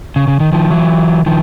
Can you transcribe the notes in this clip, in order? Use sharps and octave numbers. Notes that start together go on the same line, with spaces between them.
C#3
C#3
D#3
D#3 F3
E3 F#3
D#3 F3